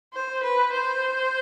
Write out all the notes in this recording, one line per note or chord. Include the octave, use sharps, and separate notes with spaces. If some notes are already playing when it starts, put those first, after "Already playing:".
C5
B4
C5